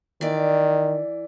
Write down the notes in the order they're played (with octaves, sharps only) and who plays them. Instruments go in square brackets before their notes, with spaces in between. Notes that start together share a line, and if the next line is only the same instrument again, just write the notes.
[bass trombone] D#3 [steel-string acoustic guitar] E3 D5